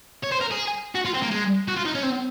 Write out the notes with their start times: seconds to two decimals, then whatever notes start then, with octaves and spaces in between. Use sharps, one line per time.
0.24 C#5
0.32 C5
0.41 A#4
0.51 G#4
0.95 F#4
1.05 F4
1.14 C4
1.22 A#3
1.31 G#3
1.68 F#4
1.77 F4
1.86 D#4
1.95 C#4
2.03 C4